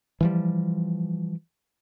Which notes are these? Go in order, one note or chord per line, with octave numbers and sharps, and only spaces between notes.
E3 F3 G3